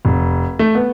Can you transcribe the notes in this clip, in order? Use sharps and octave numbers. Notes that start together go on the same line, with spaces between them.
F1
A3
B3